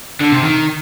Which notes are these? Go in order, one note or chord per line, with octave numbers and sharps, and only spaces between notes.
D3
C3
D#3